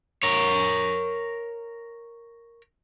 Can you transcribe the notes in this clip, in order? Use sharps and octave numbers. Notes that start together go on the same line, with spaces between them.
A#4 C#5